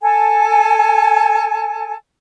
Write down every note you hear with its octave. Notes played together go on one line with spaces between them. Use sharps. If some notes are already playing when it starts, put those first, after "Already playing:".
A4 G#5